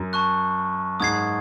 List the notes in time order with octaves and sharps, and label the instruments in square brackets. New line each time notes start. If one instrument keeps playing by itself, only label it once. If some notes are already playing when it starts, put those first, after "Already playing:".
Already playing: [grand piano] F#2
[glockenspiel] A5 C#6 F#6
[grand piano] G#2 [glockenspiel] D#6 G#6 C7